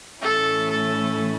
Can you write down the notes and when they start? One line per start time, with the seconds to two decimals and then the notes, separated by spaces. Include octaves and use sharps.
0.22 A2 E3 A3 C#4 E4 A4
0.71 A4